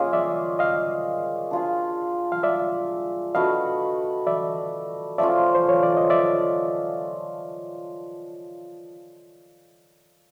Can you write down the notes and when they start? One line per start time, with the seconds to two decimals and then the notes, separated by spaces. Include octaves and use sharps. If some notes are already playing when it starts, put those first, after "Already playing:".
Already playing: A#3 C#4 F4 G#4 D#5 F5
0.13 D5 E5
0.59 D#5 F5
1.51 D4 F4 G#4
2.32 F5
2.43 D5 E5
3.35 A3 D4 F#4 B4 D#5 F5
4.27 D5 E5
5.18 F3 A3 C#4 F4 D5 E5
5.55 C5
5.69 C#5
5.83 D5
5.97 D#5
6.10 D5 E5